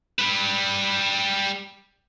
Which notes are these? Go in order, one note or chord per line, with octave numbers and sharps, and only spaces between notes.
G3 B4